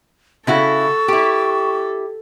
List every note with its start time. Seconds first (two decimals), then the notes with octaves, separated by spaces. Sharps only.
0.47 C#3 E4 F#4 A4 C#6
1.08 E4 G4